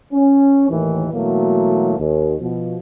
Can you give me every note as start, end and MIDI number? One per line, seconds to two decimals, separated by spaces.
0.12 0.67 61
0.69 1.07 39
0.69 1.07 45
0.69 1.07 51
0.69 1.07 52
1.12 1.96 47
1.12 1.96 52
1.12 1.96 54
1.12 1.96 57
1.12 1.96 58
1.97 2.35 39
2.40 2.77 47
2.40 2.77 53